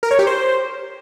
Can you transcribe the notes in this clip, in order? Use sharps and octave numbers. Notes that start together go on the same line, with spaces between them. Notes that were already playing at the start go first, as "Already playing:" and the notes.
A#4
C#5
G4
C5